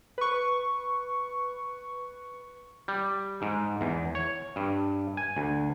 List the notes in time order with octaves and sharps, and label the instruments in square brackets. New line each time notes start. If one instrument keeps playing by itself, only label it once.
[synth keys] B4 C#6
[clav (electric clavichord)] G3
G#2
E2
C#5
G2
G#5
D2